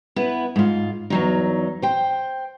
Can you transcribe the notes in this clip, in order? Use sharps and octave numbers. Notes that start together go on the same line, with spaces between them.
B3 E4 B4
G#2 F4
E2 F#3 D#4
C5 G5